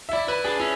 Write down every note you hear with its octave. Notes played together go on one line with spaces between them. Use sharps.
E5
E4 D5
E4 B4
D4 G#4
C#4 E4